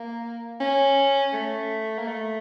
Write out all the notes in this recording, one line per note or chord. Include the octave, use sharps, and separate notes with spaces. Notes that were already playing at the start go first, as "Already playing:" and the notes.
Already playing: A#3
C#4
A3
A#3
A3